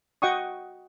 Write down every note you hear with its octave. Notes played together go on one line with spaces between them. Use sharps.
F#4 D#5 F#5 G5 C#6 D#6